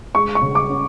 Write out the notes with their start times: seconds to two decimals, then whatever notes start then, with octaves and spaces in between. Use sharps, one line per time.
0.14 G#3 C#6
0.35 C#6
0.42 C#3
0.55 D6
0.69 C#4